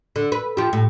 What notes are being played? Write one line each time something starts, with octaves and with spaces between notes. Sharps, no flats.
D3
B4
F3 G4
A2